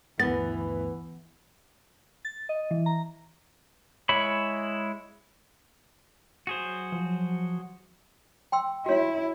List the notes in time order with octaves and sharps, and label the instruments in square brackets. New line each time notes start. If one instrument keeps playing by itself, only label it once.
[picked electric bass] G1 D2 [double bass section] E3 [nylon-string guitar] B3 [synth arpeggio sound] A6
[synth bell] A6
D#5
E3
A#5
[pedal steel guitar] G#3 E4 C#5 B5
[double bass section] F#3 [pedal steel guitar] F#4 G#4 C5
[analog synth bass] F3
[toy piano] G5 C6 E6
[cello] E4 [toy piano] F#4 C#5